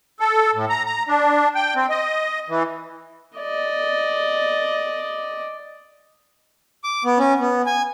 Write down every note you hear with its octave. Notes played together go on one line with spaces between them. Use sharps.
A4
A2
A#5
A#5
D4
G5
C4
D#5
E3
D5 D#5
D6
B3
C#4
B3
G#5